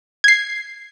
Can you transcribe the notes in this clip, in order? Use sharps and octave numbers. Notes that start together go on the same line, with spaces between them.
G#6 C7